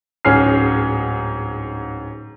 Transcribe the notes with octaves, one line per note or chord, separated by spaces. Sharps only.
D1 G#2 C#4 G#4 F6 C7